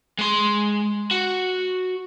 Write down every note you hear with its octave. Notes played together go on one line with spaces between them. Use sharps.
G#3 C6
F#4